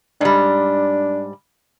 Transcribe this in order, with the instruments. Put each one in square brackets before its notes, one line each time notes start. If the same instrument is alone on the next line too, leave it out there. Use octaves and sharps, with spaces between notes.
[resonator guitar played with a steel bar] G#2 G3 [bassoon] D4